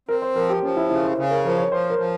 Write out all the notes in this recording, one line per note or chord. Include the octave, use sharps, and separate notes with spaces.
C4 A#4
C5
F3 A#4
G4
F3 C#4
E4
C#3 E4
C5
C#3 C5
A#4
F3 A#4
C#5
F3 C5
A#4
F3